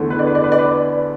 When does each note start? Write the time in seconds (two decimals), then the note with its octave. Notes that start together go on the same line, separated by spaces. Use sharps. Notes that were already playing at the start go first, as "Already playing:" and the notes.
Already playing: E2 D3 A3
0.10 B4
0.19 D5
0.27 B4
0.35 D5
0.44 B4
0.52 D5
0.59 B4